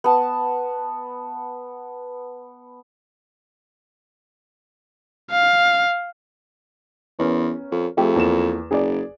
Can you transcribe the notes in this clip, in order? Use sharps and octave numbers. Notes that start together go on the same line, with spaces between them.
B3 A5
F5
E2 B3 C#4 A#4
F2
F2 A3 G4 G#4
E2 A#3 E7
F#1 G#4 D5